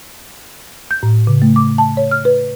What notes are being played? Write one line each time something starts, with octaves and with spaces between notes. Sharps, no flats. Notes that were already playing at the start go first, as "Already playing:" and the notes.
G6
A2
C#3
A3
D6
A5
C#5
F6
B4